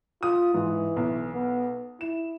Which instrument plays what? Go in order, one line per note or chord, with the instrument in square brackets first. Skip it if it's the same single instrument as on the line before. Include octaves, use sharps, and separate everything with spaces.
[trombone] F4 [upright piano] D#6
[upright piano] G#2 [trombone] E3
[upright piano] B1
[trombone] B3
[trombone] E4 [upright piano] E7